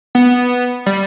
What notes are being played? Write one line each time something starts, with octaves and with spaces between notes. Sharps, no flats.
B3
G3